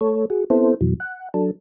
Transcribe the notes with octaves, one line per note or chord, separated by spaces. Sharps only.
A3 A4 C#5
F#4 G#4
B3 C4 E4 A4 C5
F2 B2 E3 F#3
F#5
F#3 D4 A4